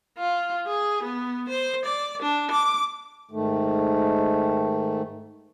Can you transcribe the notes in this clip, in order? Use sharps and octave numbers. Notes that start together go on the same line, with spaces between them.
F4
G#4
B3
C5
D5
D4
D6
G#2 D#3 A3